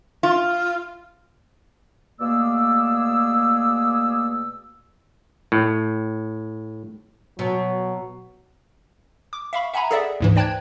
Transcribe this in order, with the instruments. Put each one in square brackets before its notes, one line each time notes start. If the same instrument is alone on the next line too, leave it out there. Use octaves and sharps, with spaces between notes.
[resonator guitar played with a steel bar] F4
[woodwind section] B2 A3 A#3 G#4 D5 E6
[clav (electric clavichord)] A2
[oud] B2 [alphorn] F#3
[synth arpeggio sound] D6
E5 F5 B5 C#6
E5 F#5 G#5 A#5 B5
G#4 A4 D5 E5 F#5
D2 G#2 E3
C5 D5 G5 A5 F#6 G#6